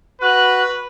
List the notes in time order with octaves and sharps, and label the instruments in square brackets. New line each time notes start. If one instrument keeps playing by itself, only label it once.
[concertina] F#4 [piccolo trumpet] B4 [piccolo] F#6